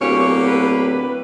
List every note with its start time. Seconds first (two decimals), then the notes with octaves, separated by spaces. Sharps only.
0.01 D1 B2 A#3 G4 C#5
0.47 B4